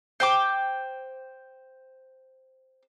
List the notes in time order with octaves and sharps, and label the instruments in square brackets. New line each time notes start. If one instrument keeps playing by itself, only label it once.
[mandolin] C5 G5 D6